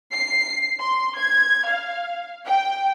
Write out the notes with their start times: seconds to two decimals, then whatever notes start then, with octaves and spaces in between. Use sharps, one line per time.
0.12 C7
0.80 C6
1.17 G#6
1.67 F5
2.45 G5